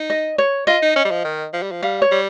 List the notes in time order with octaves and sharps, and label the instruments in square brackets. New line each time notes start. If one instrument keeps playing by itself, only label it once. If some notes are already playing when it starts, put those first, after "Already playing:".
Already playing: [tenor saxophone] D#4
[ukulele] D#5
C#5
[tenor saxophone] F4 [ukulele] D#5
[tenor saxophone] D#4
C#4
G3
F3
D#3
F3
G3
F3
[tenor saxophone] G3 [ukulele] F5
[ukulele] C#5
[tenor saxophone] G3